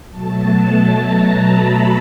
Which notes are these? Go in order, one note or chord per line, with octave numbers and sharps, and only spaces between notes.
B2 F#3 A3 A5
A#5
B5